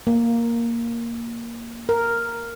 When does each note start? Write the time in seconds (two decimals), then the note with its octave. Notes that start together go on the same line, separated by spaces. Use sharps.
0.07 A#3
1.89 A#4